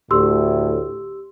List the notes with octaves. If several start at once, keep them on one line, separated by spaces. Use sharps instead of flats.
D2 A2 G4 C6 E6